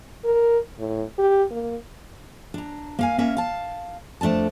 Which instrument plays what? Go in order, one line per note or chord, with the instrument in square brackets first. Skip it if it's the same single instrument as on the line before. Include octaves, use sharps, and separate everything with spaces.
[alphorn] A#4
A2
G4
A#3
[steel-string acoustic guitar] D4 A#5
A#3 F5 G#5
A#3 C#4 A#4 E5
F5 A5
F2 A3 D4 D5 A5